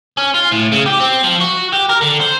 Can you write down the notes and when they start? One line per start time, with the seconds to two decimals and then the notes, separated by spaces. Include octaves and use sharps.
0.17 C#4
0.34 F4
0.52 A2
0.72 C#3
0.86 G4
1.00 C4
1.23 F3
1.40 F#4
1.72 G4
1.89 A#4
2.01 D3
2.20 C5